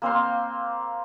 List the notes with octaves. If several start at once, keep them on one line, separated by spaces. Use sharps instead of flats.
A#3 C4 F5 C6